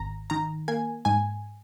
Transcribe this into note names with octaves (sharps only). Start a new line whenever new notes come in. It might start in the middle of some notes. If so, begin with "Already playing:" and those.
Already playing: G#1 A#5
D#3 A#5
A#3 G#5
G#2 G#5